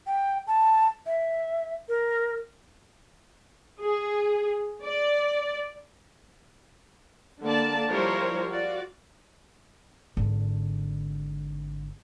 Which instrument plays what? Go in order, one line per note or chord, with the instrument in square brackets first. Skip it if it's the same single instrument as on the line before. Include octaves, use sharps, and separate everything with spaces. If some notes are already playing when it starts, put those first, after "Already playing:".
[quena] G5
A5
E5
A#4
[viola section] G#4
D5
D3 A#3 D5 A5
F3 G3 E4 A#4 C5 C#5
F4 F#4 D5
[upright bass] G#1 D3